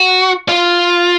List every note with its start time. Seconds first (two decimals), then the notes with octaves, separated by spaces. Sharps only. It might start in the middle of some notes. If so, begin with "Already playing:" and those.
Already playing: F#4
0.49 F4